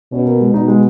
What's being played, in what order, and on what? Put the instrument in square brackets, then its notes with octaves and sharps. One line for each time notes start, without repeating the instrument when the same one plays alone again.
[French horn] B2 [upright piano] C#4
[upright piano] A#3
G#3
[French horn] B2 [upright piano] D#4
[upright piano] G#3